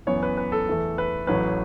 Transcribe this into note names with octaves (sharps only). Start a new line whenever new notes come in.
F#2 E3 B3 C#5
B4
B4
A4
E2 E3 A3
B4
A1 A2 F#3 B4